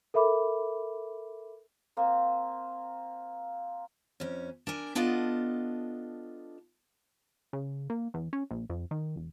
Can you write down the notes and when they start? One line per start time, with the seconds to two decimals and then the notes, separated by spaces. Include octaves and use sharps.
0.14 A4 A#4 E5 B5 D6
1.97 A#3 C4
4.20 F2 C#4
4.67 D4 A#4 G#5
4.95 B3 D4 F4 A4 D#5
7.53 C#3
7.90 A#3
8.14 E2
8.33 C#4
8.51 A#1
8.70 F2
8.91 D#3
9.16 E1